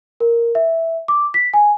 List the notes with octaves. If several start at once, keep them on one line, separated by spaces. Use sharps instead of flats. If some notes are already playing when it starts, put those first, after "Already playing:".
A#4
E5
D6
B6
G#5